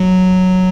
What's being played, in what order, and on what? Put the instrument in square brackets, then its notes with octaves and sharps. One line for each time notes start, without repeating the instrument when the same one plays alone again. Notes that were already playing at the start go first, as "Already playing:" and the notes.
Already playing: [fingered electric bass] F#3